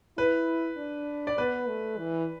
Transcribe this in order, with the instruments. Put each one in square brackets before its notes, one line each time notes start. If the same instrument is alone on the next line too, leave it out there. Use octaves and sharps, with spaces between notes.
[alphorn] E4 [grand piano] B4
[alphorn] D4
[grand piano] D5
[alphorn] B3 [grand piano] B4
[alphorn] A3
E3